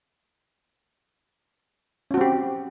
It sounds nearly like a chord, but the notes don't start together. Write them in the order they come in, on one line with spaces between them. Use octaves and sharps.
C#4 F#4 C4 G4